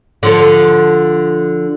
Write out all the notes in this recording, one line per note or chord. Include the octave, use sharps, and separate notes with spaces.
D3 F3 A4